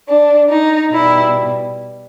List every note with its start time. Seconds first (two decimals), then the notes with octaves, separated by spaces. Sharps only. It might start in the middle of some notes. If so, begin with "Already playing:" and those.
0.08 D4
0.50 D#4
0.93 B2 G3 E4